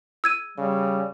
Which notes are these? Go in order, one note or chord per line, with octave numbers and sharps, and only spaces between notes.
E6 G#6 D#7
C#3 G3